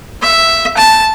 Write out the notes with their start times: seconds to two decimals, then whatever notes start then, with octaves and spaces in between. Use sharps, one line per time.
0.22 E5
0.77 A5